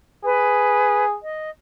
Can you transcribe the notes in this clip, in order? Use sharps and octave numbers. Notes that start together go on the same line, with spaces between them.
G#4 B4
D#5